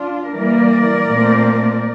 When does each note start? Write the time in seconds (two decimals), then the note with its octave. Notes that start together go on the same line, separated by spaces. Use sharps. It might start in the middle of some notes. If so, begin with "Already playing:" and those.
Already playing: D4 F4
0.35 E3 G3 A#3 A#4 D5
1.09 A#2 A3 C4